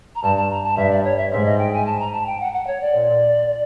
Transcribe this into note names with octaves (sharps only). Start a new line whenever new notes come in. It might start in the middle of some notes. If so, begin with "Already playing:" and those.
A#5
G2 A5
A5
A#5
A5
G2 E5
D5
C#5
E5
G#2 E5
D#5
G5
G#5
A5
A#5
A5
G5
F#5
F#5
C#5
D5
A#2